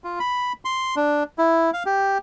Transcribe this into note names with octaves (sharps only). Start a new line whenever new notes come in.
F4
B5
C6
D4
E4
F5
G4